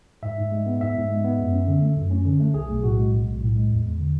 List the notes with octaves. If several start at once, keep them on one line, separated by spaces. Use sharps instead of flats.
G#2 E5
G#2
G#3
B3
G#2 E5
G#2
G#3
B3
F#2
C#4
D3
A3
F#2
C#4
D3
A3
B1 G#4
B1
A2 F#4
G#3
B1
B1
A2
G#3
E2
E2
D3